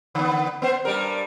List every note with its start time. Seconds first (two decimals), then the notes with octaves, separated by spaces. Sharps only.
0.15 D3 B3
0.62 B3 C5
0.85 G2 G3 A#4